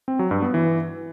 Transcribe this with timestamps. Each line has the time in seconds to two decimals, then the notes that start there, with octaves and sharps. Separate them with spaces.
0.08 C4
0.19 F#3
0.31 G2
0.42 B3
0.54 E3